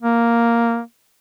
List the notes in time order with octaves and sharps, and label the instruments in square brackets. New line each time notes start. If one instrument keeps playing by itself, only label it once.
[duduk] A#3